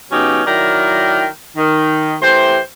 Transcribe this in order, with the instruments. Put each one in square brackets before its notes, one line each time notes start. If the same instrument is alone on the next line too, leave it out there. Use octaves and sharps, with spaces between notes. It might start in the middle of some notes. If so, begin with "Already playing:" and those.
[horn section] C#3 F#3 B3 C#4 D#4 G4
D#3 F#3 E4 A#4 D5 G5
D#3
E3 A3 G4 C5